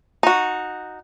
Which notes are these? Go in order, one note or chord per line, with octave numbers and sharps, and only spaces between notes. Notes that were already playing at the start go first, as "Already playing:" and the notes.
D#4 F#4